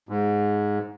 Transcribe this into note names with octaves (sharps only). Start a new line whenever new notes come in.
G#2